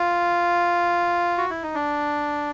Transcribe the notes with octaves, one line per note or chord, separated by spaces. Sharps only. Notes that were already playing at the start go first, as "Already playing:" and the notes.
Already playing: F4
F#4
E4
D#4
D4